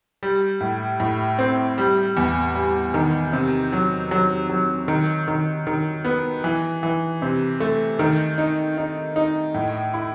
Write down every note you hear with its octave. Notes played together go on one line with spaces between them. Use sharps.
G3
A2
A2
C4
G3
E2
G3
D#3
C3
F#3
F#3
F#3
D#3
D#3
D#3
B3
E3
E3
C3
A3
D#3
D#4
D#4
D#4
A2
E4